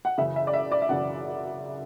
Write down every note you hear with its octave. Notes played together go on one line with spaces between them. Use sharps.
F#5
F#2 C#3 E3 E5
E5
D5
E5
D5
E5
F#2 C#3 E3 F#5